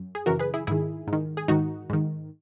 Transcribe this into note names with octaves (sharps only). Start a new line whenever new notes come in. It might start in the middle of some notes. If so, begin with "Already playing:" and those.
Already playing: F#2
G#4
F#2 C#3 E3 F#4 A#4
G#4 B4
E4 G#4
G#2 D#3 E4 G#4
G#2
D#3
G#4
G#2 D#3 D#4 F#4
G#2 D#3